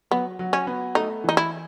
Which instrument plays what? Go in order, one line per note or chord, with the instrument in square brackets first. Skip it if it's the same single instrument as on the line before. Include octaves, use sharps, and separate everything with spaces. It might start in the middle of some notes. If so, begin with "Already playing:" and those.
[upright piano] F#3 [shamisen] B3
[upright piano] F#3
[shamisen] C#4
[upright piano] B3
[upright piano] A3 [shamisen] D#4
[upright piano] E3 [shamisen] D#4
[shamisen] E4